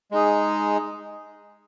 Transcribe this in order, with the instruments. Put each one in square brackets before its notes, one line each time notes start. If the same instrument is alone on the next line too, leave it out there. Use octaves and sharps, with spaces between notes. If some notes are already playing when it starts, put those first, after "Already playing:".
[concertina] G#3 D#4 G#4